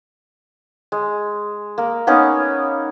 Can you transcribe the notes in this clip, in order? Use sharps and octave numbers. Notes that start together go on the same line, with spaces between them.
G#3
A#3
A#3 B3 C#4 D#4